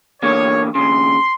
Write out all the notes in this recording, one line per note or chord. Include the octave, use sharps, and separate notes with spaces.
E2 D3 A#3 C#5
D#2 C#3 C6